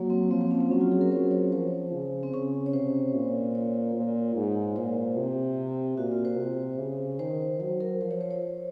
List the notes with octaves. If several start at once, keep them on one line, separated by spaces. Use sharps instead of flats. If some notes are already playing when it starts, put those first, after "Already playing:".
Already playing: F#3 A#3
C4
F3 C4
C4
C#4
C4
F#3 C#4
F4
G#4
A#4
F#3 C5
C#5
F3 C5
C#3
C4
C#3 C#4
C#5
C3 C5
A#2
C#5
A#2
G#2
A#2 C5
C3
A#2 F#4
F4
C5
C3
C#3
D#3 C5
F#3 C5
A#4
F3 C5
C#5
C5
C#5